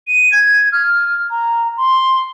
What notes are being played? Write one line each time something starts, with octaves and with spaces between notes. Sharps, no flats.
D#7
G#6
F6
A#5
C6